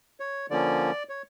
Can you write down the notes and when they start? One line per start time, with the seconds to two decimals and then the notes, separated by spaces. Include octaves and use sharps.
0.20 C#5
0.50 D3 F3 A#3 C#4 D5
1.09 C#5